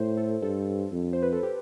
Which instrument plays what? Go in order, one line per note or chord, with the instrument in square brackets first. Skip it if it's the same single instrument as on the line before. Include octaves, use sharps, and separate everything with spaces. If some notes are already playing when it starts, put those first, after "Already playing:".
Already playing: [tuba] A2 [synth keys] C5
[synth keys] A4
[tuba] G2 [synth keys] A4
[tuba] F2
[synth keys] C5
B4
A4
G4